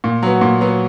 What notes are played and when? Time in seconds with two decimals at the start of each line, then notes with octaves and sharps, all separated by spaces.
0.04 A#2
0.23 F#3 B3
0.41 A#2
0.61 F#3 B3